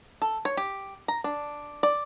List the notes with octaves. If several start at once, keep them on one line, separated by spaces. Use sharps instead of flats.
A4
C#5
G4
A#5
D4
D5